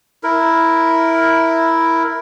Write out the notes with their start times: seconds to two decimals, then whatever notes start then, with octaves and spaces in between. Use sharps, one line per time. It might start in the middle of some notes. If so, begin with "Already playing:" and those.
0.23 E4 A#4